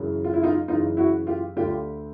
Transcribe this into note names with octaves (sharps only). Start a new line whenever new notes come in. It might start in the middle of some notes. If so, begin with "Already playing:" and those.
Already playing: F#2 C#3 E3
F4
E4
D#4 F4
F#2 C#3 E3 D#4 F4
E4 F#4
F4 G4
D2 D3 F4 G4